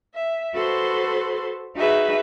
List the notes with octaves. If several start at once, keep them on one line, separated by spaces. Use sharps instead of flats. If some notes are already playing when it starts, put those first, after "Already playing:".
E5
F#4 A4 B4 C5 C6
D#4 F#4 G#4 B4 E5